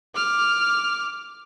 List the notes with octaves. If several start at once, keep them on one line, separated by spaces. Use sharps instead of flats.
D6 F6